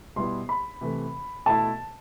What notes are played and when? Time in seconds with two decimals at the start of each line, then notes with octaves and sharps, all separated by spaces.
0.16 B2 G3 B3 E4 C6
0.49 B5
0.81 C3 E3 A3
1.46 B2 A3 E4 A5